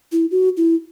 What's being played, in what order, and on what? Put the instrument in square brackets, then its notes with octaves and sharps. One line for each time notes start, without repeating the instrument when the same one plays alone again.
[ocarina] E4
F#4
E4